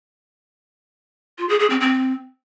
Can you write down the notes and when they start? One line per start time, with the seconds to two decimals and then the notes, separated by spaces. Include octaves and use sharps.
1.38 F4
1.49 G#4
1.59 G#4
1.70 C4
1.81 C4